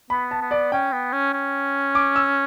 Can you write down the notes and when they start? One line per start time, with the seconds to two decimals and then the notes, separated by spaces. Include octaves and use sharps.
0.10 B3 B5
0.31 A5
0.41 B3
0.51 D5
0.72 C#4 G5
0.92 B3
1.13 C#4
1.33 C#4
1.95 D6
2.16 E6